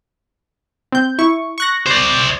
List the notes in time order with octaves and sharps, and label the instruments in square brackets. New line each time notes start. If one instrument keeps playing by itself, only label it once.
[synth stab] C4 G6
E4 C#6
C#6 F#6 A#6
[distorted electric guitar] C5 D5